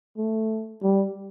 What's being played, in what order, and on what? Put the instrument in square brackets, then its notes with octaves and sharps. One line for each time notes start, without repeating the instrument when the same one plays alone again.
[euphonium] A3
G3